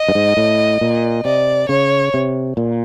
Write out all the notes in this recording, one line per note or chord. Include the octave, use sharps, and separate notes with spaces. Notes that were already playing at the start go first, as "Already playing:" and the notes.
Already playing: D#5
G2
G#2
A2
A#2
C3 D5
C#3 C#5
C3
A#2